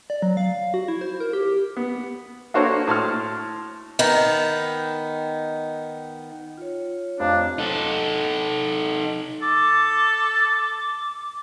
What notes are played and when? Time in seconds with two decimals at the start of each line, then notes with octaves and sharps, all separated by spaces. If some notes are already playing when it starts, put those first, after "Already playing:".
0.10 D5
0.22 F#3
0.37 F5
0.74 F#4
0.88 E4
1.01 C5
1.20 A#4
1.33 G4
1.77 B3
2.54 A#3 D4 F#4 A4 C5 C#5
2.87 A2 A5 C6 F6
3.99 D#3 B3
6.58 F4 C#5
7.20 F1 F3 D4
7.58 D#4 A4
9.42 A4 D6